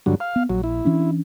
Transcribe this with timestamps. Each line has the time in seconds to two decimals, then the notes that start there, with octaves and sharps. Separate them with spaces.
0.06 G2 D3 F#3
0.20 F5
0.36 B3
0.50 A#1 F#3
0.64 E4
0.85 E3 C#4 D4